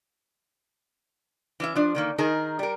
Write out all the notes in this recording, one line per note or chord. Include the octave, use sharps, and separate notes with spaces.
E3 C#4 E5
F3 D4
D3 D#3 A#3
D#3 D#4 G#4 A#4
G3 A#4